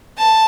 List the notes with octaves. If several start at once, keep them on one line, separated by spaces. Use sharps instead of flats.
A5